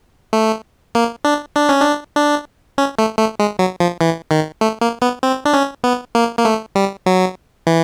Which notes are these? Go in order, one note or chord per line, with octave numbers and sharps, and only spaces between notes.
A3
A#3
D4
D4
C#4
D4
D4
C#4
A3
A3
G#3
F#3
F3
E3
D#3
A3
A#3
B3
C4
D4
C#4
B3
A#3
A#3
A3
G3
F#3
E3